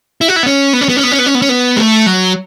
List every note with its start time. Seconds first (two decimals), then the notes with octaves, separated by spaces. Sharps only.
0.21 E4
0.28 F#4
0.36 E4
0.43 B3
0.46 C#4
0.73 B3
0.81 C#4
0.89 B3
0.97 C#4
1.03 B3
1.11 C#4
1.19 B3
1.27 C#4
1.35 B3
1.42 C#4
1.49 B3
1.76 G#3
1.79 A3
2.06 F#3